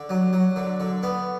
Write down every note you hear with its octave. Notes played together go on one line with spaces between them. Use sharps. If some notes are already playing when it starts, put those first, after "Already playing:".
Already playing: D3
F#3
F#3
D3
D3
B3